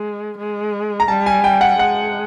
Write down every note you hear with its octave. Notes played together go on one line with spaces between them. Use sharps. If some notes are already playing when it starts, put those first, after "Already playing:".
Already playing: G#3
G#3
A#5
G3 A5
G#5
G5
F#5
G#3 F#5